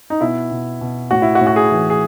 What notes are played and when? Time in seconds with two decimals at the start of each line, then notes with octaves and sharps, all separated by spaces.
0.10 D#4
0.21 B2 E4
0.51 B2
0.81 B2
1.11 A2 F#4
1.22 E4
1.35 F#4
1.41 A2
1.47 F#4
1.56 G#4
1.71 E3
1.90 G#4